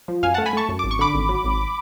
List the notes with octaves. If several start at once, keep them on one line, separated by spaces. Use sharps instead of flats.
F3
F#2 F5 G#5
A3 F#5 A5
G#5 B5
A3 A5 C#6
F#2
G#1 D6
C#6
D3 B5 D6
G#1
F#3
G#1